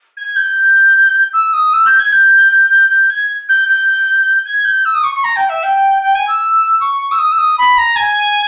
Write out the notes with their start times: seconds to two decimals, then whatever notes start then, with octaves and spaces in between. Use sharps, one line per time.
0.17 G#6
0.36 G6
1.33 E6
1.53 D#6
1.73 E6
1.86 G6
1.99 G#6
2.12 G6
2.51 G6
2.70 G6
2.90 G6
3.10 G#6
3.49 G6
3.68 G6
4.45 G#6
4.65 G6
4.85 E6
4.95 D#6
5.04 C#6
5.14 C#6
5.24 A#5
5.36 G5
5.49 E5
5.63 G5
6.02 G5
6.15 G#5
6.28 E6
6.80 C#6
7.11 E6
7.18 D#6
7.32 E6
7.38 D#6
7.58 B5
7.78 A#5
7.96 G#5